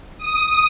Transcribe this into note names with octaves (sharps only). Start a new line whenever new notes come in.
D#6